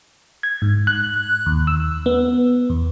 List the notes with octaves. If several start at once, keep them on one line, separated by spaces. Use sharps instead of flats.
G#6
G#2
F#6
D#2
E6
B3
E2